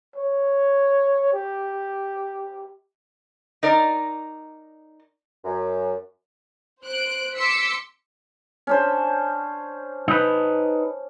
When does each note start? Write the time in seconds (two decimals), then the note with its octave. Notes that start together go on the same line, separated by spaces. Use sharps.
0.16 C#5
1.33 G4
3.63 D#4 A#4 D5
5.44 F#2
6.83 C5 F#6 D7
7.36 C6 D6 E6 B6 C#7
8.67 C#4 D4 C5
10.08 D#4 B4